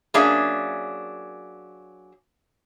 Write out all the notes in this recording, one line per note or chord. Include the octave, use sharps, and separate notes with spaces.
F#3 A#3 C#4 D4 G#4 E5